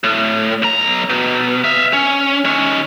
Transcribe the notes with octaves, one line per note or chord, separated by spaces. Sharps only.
A2
B1 A#5
B2
E5 F5
C#4
D#3 C#4